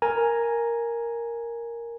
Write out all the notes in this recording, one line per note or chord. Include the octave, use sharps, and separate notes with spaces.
A#4 G#5 A#5